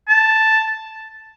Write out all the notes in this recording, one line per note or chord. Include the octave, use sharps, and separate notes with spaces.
A5